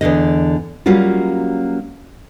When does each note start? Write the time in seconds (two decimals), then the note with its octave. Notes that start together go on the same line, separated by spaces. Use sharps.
0.01 E2 G2 D3 D#5
0.86 F#3 G3 A#3 C#4 F4 F#4